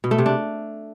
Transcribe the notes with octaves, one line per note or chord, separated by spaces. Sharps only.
B2
A3
C3
D4